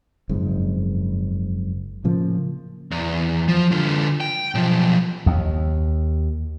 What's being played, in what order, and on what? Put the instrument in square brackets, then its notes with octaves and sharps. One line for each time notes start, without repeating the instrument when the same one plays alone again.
[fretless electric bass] F#1 F2 G#2
A2 C#3 F3 A#3
[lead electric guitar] E2
F3
D3 F4
G5
B1 F3
[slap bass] D#2